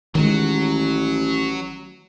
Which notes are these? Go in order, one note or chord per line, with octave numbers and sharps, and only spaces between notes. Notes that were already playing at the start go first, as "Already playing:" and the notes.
A1 D#3 F#3 G#3